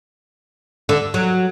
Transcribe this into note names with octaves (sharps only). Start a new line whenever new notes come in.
D3
F#3